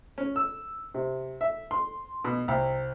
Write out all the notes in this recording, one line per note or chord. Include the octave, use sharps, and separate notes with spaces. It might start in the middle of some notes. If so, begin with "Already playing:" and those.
C#4
E6
C3
E5
C6
B2
C2